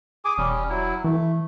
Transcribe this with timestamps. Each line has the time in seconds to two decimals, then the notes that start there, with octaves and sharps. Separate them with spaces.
0.25 G#4 G#5 D6
0.38 E1 G3 C#4
0.69 F#3 E4
1.04 E3 A3